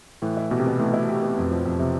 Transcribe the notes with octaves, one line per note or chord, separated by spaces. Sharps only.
A2 E3
E4
B2 G4
C3
B2 B3
E3 A3
E4
G4
B3
F2
F3
F2
C3